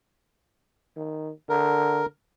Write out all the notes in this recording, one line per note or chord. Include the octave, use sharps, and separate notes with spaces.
D#3
D3 A#4